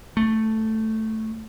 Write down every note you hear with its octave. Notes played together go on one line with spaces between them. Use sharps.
A3